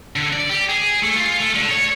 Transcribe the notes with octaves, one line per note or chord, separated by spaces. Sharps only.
D3
D5
G4
G#4
A3
F4
A3
D3
C#5